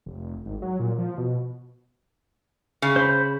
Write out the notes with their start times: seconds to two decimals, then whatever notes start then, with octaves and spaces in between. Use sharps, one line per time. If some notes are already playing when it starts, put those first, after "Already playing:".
0.06 F1
0.46 G#1
0.62 F#3
0.80 A#2
0.98 F3
1.18 B2
2.82 C#3
2.96 C5 B5